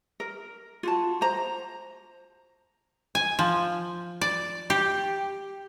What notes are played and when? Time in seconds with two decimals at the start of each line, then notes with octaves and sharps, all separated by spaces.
0.20 A#4
0.83 F4 F#4 A5
1.21 C5 A#5
3.15 G#5
3.39 F3
4.21 D5
4.70 G4